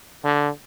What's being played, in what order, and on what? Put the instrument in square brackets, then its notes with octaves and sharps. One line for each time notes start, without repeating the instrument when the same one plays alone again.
[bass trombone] D3